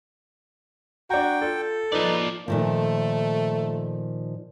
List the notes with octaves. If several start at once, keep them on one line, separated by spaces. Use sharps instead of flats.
D4 F#4 G5 A#5
F4 A4
F3 D#4 B4 D5
A#2 D#3 F3 A3